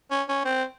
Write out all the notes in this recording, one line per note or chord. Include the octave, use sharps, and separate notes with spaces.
C#4
C#4
C4